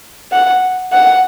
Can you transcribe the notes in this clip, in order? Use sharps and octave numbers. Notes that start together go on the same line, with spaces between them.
F#5
F#5